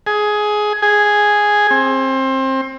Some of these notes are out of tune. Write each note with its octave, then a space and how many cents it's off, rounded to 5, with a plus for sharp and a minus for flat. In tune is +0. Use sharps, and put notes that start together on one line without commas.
G#4 +15
G#4 +0
C4 +25